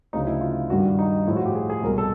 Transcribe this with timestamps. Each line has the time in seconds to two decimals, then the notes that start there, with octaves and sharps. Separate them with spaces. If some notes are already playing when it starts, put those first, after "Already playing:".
0.13 D2 C#3 F#3 D#4
0.27 E4
0.41 F4
0.70 G2 D#3 G3 F#4
0.99 D#4
1.27 A2 F3 G#3 E4
1.36 F#4
1.46 G4
1.55 G#4
1.70 G#4
1.83 C2 B2 G#3 A#4
1.98 A4